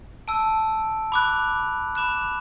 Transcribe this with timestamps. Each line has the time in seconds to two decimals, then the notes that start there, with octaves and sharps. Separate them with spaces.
0.28 A5 E6 D7
1.12 B5 D6 F#6
1.95 B5 D6 F#6 E7